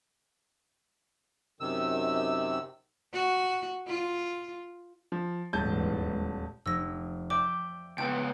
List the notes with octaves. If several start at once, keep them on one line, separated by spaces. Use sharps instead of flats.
F#2 C3 D#3 E6
F#4
F4
F3
D#1 E2 G#2 A5 G6
F1 E6 A#6
D5 E5 G5 D6
C#2 B3 G5 A5 G6 A6